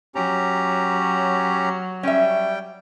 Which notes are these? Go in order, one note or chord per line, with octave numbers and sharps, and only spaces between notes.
F#3 C#4 G4 A#5
G3 C#4 E5 G5